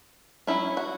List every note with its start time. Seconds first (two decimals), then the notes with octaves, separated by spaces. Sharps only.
0.47 F#3 C#4 E4
0.77 F#4